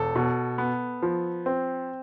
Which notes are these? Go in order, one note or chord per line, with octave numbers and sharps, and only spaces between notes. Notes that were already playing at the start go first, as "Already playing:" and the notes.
Already playing: E1 A4
B2
B3
F3
C4